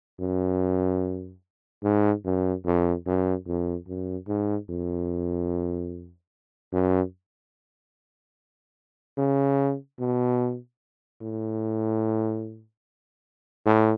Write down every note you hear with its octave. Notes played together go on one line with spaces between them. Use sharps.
F#2
G#2
F#2
F2
F#2
F2
F#2
G#2
F2
F#2
C#3
B2
A2
A2